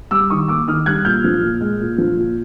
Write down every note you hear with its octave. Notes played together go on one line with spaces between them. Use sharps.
G3 D6 E6
D#3 C#6 D#6
A#3 D6 E6
D#3 D#6 F6
G3 F#6 G#6
A#2 F6 G6
F3
A#2
G#3
A#2
F3
A#2